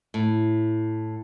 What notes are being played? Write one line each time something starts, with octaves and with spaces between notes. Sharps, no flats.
A2